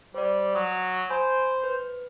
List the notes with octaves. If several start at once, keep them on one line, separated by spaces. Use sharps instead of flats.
G3 C5 D5
F#3 D#6
C5 G#5 B5
B4